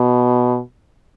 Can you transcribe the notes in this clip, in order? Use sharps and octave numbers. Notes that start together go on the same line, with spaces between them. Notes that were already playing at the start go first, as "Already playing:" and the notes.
Already playing: B2